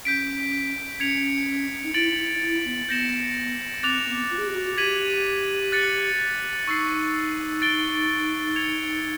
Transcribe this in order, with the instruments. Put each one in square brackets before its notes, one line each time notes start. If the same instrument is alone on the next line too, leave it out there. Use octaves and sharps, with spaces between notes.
[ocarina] C#4 [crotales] G6 B6 D7
[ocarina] C#4 [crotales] G#6 C#7 F7
[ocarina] D#4
[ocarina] E4 [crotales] A6 D7 F#7
[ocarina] E4
E4
B3
[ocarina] B3 [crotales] G6 A#6 C#7 E7
[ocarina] C4 [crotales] D6 F#6 A6 C#7 F7
[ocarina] B3
F4
G#4
G4
F#4
[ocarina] G4 [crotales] G#6 B6 D#7 F#7
[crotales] F#6 A6 C#7 F#7
[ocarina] D#4 [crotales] C#6 E6 A6 C7
[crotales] A6 D7 G7
G#6 C#7 F7